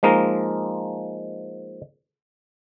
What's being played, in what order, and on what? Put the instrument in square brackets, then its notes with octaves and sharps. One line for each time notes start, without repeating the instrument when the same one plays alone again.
[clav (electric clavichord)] F3 G#3 A#3 D#4 A#4